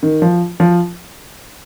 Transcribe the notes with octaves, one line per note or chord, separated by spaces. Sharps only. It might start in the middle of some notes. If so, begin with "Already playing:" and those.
D#3
F3
F3